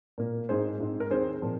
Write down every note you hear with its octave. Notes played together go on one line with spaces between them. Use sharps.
A#2 A#3
G#2 G#3 C4 G#4 C5
G#2 G#3 C4
A#4
D#2 D#3 C4 G#4 C5
A#2 F3 C4